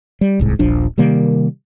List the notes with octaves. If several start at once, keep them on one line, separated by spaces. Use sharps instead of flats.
G3
D1 C2 G#2
D#1 A#1 F3 D4
C3 D#3 G3 A#3